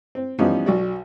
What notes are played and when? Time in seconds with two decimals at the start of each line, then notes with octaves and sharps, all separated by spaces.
0.15 C4
0.39 E3 F3 G3 B3 C#4 D#4
0.66 B1 F#4 D5